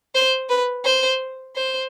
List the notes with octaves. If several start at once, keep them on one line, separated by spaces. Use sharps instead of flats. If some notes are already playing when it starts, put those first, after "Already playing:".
C5
B4
C5
C5